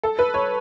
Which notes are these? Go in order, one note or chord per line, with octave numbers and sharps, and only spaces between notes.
A4
B4
C#5